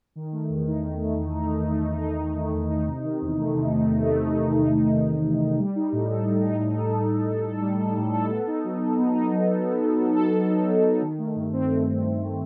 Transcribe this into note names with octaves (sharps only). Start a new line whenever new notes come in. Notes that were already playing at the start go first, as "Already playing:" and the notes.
D#3
A3
E2
D#4
D#3
A3
E2
D#4
D#3
A3
E2
D#4
D#3
A3
E2
D#4
C3
D#3
E2
A3
C3
D#3
E2
A3
C3
D#3
E2
A3
C3
D#3
E2
A3
G3
D#4
A2
A4
G3
D#4
A2
A4
G3
D#4
A2
A4
G3
D#4
A2
A4
B3
D#4
F#3
A4
B3
D#4
F#3
A4
B3
D#4
F#3
A4
B3
D#4
F#3
A4
D#3
A3
G2
C4
D#3
A3
G2
C4